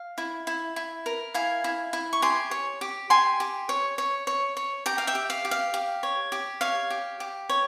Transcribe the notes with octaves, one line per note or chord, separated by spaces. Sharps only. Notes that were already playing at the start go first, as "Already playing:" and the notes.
Already playing: F5
E4
E4
E4
A#4
E4 F5 G#5
E4
E4
C#6
G4 G#5 C6
C#5
G4
G4 G#5 C6
G4
C#5
C#5
C#5
C#5
G4 G5 A#5
F5
E5 G5
G4
F5
G4
F5
G4
C#5
G4
C#5 F5
G4
G4
C#5